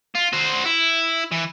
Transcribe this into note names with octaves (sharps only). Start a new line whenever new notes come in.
F4
F#4 C5
E4
E3